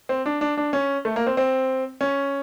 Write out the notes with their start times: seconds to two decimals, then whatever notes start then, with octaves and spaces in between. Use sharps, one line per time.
0.09 C4
0.26 D4
0.41 D4
0.57 D4
0.73 C#4
1.05 A3
1.16 A#3
1.27 C4
1.37 C4
2.01 C#4